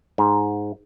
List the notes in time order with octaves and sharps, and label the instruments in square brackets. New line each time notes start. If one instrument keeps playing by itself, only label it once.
[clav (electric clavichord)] G#2